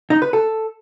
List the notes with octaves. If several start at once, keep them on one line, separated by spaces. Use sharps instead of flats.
D#4
B4
A4